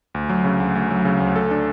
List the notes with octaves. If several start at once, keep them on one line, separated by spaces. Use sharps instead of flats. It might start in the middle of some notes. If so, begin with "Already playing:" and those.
D2
F#3
C#3
D2
D2
F#3
C#3
D2
A4
D4